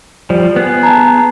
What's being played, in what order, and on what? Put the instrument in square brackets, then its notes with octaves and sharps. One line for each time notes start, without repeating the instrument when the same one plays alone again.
[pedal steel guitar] F3 G3
B3 G#4
[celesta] A5 A#5